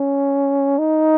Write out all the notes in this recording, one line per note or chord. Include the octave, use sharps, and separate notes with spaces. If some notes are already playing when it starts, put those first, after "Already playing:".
Already playing: C#4
D#4